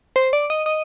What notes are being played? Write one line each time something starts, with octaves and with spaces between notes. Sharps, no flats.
C5
D5
D#5
D#5